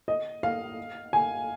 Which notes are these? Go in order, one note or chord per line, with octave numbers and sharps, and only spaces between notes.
D#5
F5
G#5